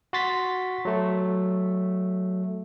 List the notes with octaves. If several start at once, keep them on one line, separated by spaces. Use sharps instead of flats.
F#4 C6 A6 B6
F#3 A3